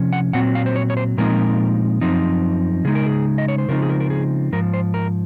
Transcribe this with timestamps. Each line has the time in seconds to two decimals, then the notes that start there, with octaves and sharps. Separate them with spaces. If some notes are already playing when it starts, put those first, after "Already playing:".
Already playing: C3 F3 C#4
0.13 F#5
0.33 A#2 F#3 C4 F#5
0.55 F5
0.66 C5
0.76 C#5
0.90 C#5
0.97 C5
1.18 A#2 F3 G#3 C4 D#4 A#4
2.01 F#2 F3 C4 D#4
2.85 C#3 G#3 D#4 G#4
2.95 A#4
3.06 G#4
3.38 D#5
3.48 C#5
3.58 C5
3.68 C#3 F3 G#3 C4 D#4 A#4
3.82 G#4
3.89 A#4
4.00 A#4
4.10 G#4
4.53 G#2 F3 A#4
4.74 C5
4.94 A#4